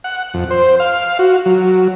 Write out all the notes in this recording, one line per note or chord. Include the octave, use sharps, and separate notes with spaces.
F#5
F2
C5
F5
F#4
F#3